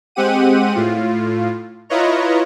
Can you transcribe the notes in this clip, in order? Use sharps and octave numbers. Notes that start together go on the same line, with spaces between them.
G#3 C4 G4 F#5 D#7
A2 F4
E4 F4 B4 C#5 D#5 A#5